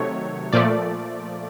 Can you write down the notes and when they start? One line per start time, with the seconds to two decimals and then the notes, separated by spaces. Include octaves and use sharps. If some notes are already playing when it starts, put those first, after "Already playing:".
Already playing: C3 D#3 F#3 A3 C#5
0.53 A#2 F3 A3 D5